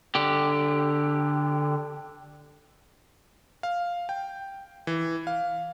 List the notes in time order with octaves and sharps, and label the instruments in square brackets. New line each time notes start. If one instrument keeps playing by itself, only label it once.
[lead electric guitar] D3 G4
[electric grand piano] F5
G5
E3
F5